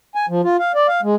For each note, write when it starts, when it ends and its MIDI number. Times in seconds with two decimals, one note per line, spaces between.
0.15 0.26 80
0.29 0.41 53
0.44 0.57 65
0.59 0.72 77
0.75 0.87 74
0.88 1.01 77
1.03 1.15 56